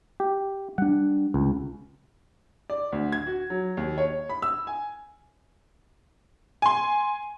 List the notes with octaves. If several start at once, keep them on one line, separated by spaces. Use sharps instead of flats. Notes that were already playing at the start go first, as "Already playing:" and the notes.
G4
G3 D4 F#5
C#2
D5
D2
G#6
F#4
F#3
D#2
C#5
B5
E6
G#5
G#5 C6